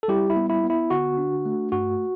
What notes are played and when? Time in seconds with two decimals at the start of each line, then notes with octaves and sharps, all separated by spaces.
0.03 A4
0.08 G3 E4 G4
0.30 E4
0.36 B3
0.49 E4
0.64 B3
0.70 E4
0.90 D3 F#4
1.17 D4
1.46 A3
1.72 G2 F#4